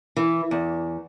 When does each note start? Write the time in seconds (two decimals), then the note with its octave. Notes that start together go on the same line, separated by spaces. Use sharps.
0.16 E3
0.51 E2